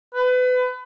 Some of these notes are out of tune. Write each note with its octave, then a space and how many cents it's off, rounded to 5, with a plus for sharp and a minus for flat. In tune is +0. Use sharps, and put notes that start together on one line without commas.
B4 +30